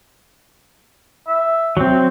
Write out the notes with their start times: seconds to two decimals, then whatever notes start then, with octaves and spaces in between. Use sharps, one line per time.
1.27 E5
1.77 F#3 C4